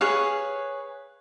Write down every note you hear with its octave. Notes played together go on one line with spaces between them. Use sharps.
G#4 B4 C#5 F5